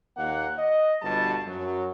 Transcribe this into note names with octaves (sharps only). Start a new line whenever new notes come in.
D#2 A#2 A#3 F#5
D#5
G1 B2 G3 A5
F#2 F#3